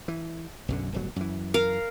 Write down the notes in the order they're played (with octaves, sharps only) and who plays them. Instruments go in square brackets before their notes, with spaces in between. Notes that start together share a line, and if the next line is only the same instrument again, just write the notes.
[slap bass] E3
B1 F#2 D3
D1 G1 F#3
F#2 E3
[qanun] A#4 F5